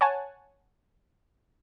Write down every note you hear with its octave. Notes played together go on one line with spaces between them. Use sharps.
C#5 F#5 G#5 A5